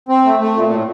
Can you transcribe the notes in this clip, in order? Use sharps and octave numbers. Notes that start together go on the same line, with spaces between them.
C4
A3
A3
A#2
A2